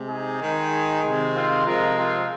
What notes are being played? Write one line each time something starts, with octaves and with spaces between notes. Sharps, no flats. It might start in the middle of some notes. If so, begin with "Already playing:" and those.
Already playing: C3 G#3
D#4 G#4
D#3 G#3
C3 D#3 G#3
C4 F4
C3 F3 G#3 F4 A#4
C4 F4